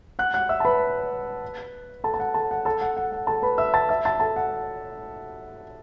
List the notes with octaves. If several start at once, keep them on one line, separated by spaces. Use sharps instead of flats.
F#5 F#6
F#5 F#6
E5 E6
A5
B4 B5
A4 A5
A5
F#5
A4 A5
F#5
A4 A5
F#5
F#5
F#5
A4 A5
B4 B5
E5 E6
A5 A6
E5 E6
A5 A6
A4 A5
F#5